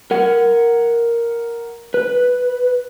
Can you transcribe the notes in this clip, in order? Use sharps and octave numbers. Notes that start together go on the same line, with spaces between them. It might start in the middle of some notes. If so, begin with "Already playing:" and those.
A#4 F#5
B4